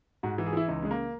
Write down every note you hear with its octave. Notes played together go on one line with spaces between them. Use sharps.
G#2 F#4
E3
G#4
E3 E4
C#2 D#4
C#3 G#3
A#3